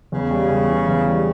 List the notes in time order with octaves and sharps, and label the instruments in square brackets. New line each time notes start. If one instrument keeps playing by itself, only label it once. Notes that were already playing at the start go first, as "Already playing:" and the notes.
[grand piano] E2 [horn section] C#3
[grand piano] G3
E2
E3
E2
G3